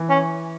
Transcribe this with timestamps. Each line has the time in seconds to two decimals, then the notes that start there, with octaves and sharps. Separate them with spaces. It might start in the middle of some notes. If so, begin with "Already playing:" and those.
Already playing: E3
0.09 C#4